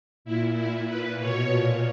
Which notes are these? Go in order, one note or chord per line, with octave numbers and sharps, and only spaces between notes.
A#2 E4
A#2 E4
A#2 B4
B2 C#5
A#2